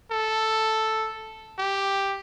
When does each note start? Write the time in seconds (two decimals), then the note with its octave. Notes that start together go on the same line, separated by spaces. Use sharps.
0.11 A4
1.59 G4